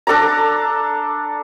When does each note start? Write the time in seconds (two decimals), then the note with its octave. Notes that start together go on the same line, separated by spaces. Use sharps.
0.07 D4 A4 D5 A#5